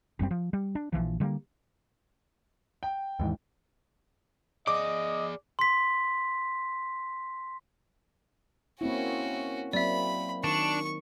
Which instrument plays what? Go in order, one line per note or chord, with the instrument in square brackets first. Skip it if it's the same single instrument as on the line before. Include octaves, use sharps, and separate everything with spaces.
[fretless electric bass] F#1 F#2 G3 C4
F3
G3
D4
A#1 D#2 E3 F3
D3 G3 G#3 A#3
[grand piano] G5
[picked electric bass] D#2 G#2 E3
[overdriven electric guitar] G#4 D5 [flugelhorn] D#5 [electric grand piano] D6
[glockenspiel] C6 B6
[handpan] A#3 C4 E4 [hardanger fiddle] C#4 F#4
[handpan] F#3 A#3 C4 [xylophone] D5 E5 [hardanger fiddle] B5
[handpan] D#3 [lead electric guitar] D4 [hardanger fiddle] C#6 [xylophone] E7